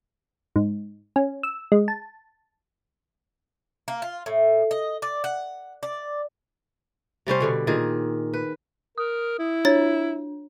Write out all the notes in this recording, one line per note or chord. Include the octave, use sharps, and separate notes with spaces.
G#2
C#4
E6
G#3
A5
A#3
F4
A2
D#5
D5
F#5
D5
C3 G3 C#4 C5
B2 D3 G3
A#2 D#3 G#4
B4
A#4 D#6
E4
D4 C#5 A6